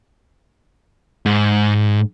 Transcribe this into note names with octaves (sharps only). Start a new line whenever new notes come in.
G#2